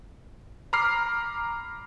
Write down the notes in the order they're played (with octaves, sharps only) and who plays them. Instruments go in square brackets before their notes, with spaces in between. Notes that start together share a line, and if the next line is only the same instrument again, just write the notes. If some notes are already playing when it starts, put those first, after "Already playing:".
[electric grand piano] A#5 B5 D6 F6 C7